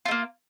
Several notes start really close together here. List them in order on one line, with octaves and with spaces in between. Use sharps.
F4 A3 A#3